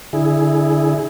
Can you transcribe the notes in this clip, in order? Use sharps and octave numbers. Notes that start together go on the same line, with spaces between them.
D3 E4 G#4